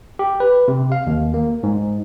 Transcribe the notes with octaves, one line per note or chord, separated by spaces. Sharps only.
G4
B4
C3
F5
D#2
A#3
G#2